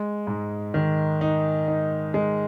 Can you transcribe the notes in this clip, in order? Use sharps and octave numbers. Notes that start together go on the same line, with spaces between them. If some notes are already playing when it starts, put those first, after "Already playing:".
Already playing: G#3
G#2
D#3
D#4
D#4
G#3